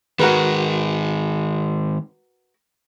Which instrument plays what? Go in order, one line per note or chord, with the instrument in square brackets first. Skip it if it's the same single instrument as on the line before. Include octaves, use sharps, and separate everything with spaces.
[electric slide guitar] D#3 G#3 [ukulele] F#4 A#4 B4